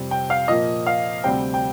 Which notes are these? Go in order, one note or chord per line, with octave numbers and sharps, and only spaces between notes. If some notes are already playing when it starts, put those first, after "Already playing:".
Already playing: F2 C3 G3 C4
G5
F5
A#2 F3 A#3 D#5
F5
D2 C3 G3 C4 G5
G5